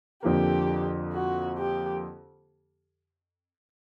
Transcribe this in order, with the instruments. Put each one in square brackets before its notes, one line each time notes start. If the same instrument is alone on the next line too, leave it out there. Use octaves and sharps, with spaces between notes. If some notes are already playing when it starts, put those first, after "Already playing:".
[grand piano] F2 D3 F3 A#3 [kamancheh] G4
[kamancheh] F#4
G4